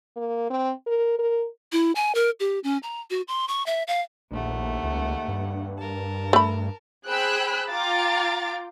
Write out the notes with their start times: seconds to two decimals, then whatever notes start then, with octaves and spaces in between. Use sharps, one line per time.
0.16 A#3
0.50 C4
0.86 A#4
1.19 A#4
1.72 E4
1.95 G#5
2.15 A#4
2.40 G4
2.64 C#4
2.83 A#5
3.10 F#4
3.28 C6
3.48 C#6
3.66 E5
3.87 F5
4.31 A#1 D#2 A3 F#5
4.83 C#2
5.28 G2
5.77 A#4 A5
6.33 A3 B5
7.08 G#4 C5 G5 B5 E6 F#6
7.69 F4 F5 G5 A#5 D6 A6